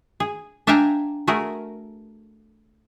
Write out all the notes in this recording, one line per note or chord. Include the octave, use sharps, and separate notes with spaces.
G#4
D4 E5 F5 G5 G#5 A#5
A3 F#4 G#4 A#4